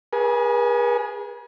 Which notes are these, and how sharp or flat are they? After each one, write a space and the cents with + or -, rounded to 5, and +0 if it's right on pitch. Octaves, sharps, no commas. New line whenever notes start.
G#4 -20 B4 -45 G#5 +30